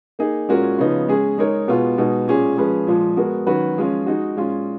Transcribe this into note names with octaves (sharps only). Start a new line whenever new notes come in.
A#3 D#4 G#4
A#2 G#3 C#4 F#4 A#4
C#3 F3 B3 D#4
G#3 C#4 G#4
G#3 D#4 A#4 C#5
B2 G#3 B3 F4
B2 G#3 B3 D#4
A#2 G#3 C#4 G#4
F3 G#3 C#4 G#4 B4
A#2 F3 G#3
G#3 B3 F#4 A#4
D#3 F#3 C#4 F#4 B4
F3 G#3 C#4 F4
G#3 D#4 F#4
A#2 G#3 C#4 F4